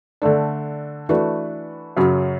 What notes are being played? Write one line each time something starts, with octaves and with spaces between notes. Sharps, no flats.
D3 A3 D4
E3 A3 D4 F#4 B4
F#2 C#3 F#3